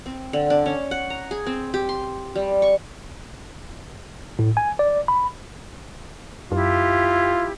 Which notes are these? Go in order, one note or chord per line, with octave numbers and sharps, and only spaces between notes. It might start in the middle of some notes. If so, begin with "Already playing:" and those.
C4
D3
D4
C#4
F#5
A#5
G#4
C4
G4
C6
G3
C#6
A2
G#5
D5
B5
F#2 E4 F4 G4